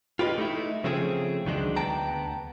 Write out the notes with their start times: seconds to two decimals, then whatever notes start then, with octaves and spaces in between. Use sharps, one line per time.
0.19 F4 G4 B4 C5 D#5
0.38 A3 D#4 E4
0.84 C#3 F3 A3 C4 E4 G#4
1.45 C#2 D#3 F#3 G#3 D4
1.76 D2 B3 G5 A5 A#5